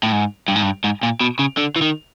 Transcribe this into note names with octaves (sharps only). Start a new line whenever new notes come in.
A2
G#2
G2
G#2
G2
G#2
A#2
B2
C#3
D3
E3
D#3